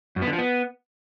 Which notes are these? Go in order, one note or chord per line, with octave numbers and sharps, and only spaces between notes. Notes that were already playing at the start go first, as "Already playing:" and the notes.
F#2
B3
D3
F3
B3